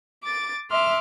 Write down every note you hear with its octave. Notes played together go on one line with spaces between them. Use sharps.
D6 A6
E5 C6 D6 F6